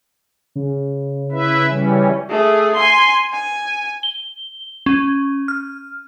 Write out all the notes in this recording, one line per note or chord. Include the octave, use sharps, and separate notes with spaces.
C#3
E4 B4 E5
E3 G3 C#4
A3 G#4
G#5 C6
G#5
G7
C#4
F6